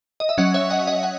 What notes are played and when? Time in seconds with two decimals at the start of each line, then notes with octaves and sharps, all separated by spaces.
0.20 D#5
0.29 E5
0.38 F#3 C#4 D#5 F#5
0.54 C#5 E5
0.70 D#5 F#5
0.87 D#5 F#5
1.03 F#5